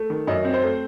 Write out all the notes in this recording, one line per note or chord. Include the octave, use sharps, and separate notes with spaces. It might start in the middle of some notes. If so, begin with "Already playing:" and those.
Already playing: A3
D#3
F#2 D#5
C4
C5
A3